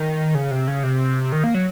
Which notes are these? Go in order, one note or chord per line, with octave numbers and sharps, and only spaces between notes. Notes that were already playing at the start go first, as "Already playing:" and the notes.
Already playing: D#3
C#3
C3
C#3
C3
D#3
A#3
F#3